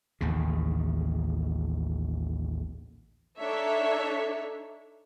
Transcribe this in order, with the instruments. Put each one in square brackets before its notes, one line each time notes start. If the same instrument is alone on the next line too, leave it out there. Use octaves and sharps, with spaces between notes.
[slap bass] A1 D#2 C#3
[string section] D4 D#4 A4 C#5 E5